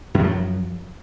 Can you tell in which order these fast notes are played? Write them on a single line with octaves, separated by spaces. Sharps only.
F#2 F3 F#3